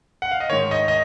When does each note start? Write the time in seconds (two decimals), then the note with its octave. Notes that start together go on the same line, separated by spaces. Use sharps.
0.22 F#5
0.31 F5
0.40 D#5
0.49 G#2 D#3 C#5
0.71 D#5
0.88 D#5